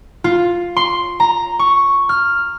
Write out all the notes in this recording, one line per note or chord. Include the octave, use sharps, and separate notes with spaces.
F4
C6
A#5
C#6
F6